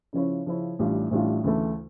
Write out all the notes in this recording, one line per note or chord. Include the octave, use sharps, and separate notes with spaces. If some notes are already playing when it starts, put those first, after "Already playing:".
C#3 F3 C#4 E4
C#3 F3 C#4 E4
A1 A2 G3 D4 F4
A1 A2 G3 D4 F4
D2 C#3 E3 A3 E4